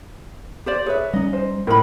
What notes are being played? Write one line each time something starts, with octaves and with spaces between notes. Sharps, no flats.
G4 C5 D5
G#4 B4 C#5 E5
G3 C#4 D#4 D#5
C5
A2 A#4 B5